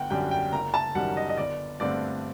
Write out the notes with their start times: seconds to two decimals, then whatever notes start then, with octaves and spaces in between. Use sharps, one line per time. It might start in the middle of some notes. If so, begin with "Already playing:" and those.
Already playing: G1 F#5 G5
0.10 F#2 D3 G3 G5
0.31 G5
0.53 F#1 A#5
0.74 A5
0.95 F#2 D#3 G3 F#5
1.17 D#5
1.29 D#5
1.37 G1 D5
1.80 G2 D3 A3 C4 D5